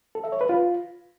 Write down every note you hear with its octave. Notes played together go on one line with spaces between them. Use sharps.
A4
E5
C#5
B4
F4